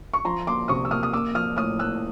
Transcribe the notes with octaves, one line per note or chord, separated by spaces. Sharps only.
C#6
F3 A#5 C6
A#3 C6 D6
C3 C#6 D#6
E6
A#3 D#6 F6
D#6
A#3 D6 E6
F3 D#6 F6
A2 D#6 F6
A#3 E6 F#6